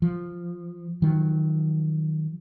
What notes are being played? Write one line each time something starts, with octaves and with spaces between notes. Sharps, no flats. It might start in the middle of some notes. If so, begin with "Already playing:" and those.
F3
D#3 F3 F#3